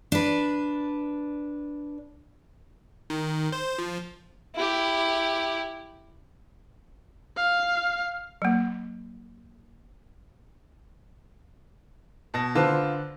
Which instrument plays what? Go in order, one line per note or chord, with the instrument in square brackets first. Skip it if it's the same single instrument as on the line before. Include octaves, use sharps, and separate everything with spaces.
[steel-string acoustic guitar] D4 B4
[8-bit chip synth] D#3
C5
F3
[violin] E4 G4
[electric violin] F5
[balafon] F#3 A#3
[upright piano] B2 A5 A#6
[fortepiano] D3 B4 C5 [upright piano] F4 A5